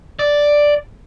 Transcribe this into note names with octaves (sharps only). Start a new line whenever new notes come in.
D5